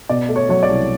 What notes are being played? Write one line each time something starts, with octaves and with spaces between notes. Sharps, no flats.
B2 D5
A3
C#5
F#3 C#5
D5
C2